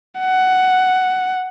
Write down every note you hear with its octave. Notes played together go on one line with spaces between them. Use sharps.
F#5